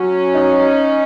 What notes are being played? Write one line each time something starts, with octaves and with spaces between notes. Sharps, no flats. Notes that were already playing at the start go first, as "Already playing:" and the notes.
Already playing: F#3 C#4
D#4